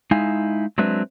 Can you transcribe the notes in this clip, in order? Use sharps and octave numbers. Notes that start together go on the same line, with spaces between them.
G#3 D#4 E4 F5 G#5
F#3 G#3 C4 D4 B4 E5